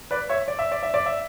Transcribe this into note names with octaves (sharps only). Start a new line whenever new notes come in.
B4 D5
C#5 E5
D5
E5
D5
E5
D5
E5